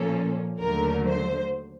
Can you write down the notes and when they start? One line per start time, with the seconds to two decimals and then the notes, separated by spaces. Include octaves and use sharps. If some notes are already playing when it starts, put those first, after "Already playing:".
Already playing: A#2 F3 A#3 C#4 A4
0.59 D#2 D3 F#3 A3 A#4
1.07 C5